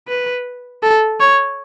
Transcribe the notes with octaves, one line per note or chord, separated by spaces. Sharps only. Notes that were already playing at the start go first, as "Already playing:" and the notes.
B4
A4
C#5